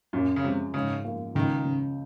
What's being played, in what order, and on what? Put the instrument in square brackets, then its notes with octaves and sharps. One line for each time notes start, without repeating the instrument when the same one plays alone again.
[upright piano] F#2 [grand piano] A#2
[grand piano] C#3
[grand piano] C3 [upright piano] G#3
[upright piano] G#2 [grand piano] C#3
[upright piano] A#3
[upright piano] C#2 [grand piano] D#3
[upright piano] C#3